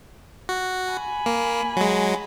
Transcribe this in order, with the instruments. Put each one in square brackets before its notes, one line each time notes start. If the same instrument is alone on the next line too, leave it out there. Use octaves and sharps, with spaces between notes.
[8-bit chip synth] F#4
[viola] G#5 B5
[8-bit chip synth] A#3
F#3 G#3